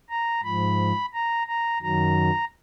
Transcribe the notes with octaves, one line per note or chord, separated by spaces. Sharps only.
A#5
G#2 F3 B5
A#5
A#5
F#2 D#3 F#3 A#5